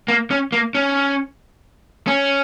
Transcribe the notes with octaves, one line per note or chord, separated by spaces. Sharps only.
A#3
C#4
A#3
C#4
C#4